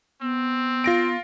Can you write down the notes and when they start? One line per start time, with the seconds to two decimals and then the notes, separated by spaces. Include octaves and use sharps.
0.22 B3 C4
0.84 F4 A#6 D7